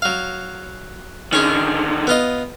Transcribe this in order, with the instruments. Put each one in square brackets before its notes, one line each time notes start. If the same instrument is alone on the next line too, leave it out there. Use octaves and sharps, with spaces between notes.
[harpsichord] F#3 F5
[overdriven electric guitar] D3 D#3 [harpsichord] C#4 G#4
[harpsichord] B3 F4 D#5